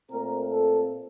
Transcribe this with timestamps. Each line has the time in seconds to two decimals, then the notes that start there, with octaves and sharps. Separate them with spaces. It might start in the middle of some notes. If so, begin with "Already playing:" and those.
0.10 A#2 A3 C4 A#4
0.51 A4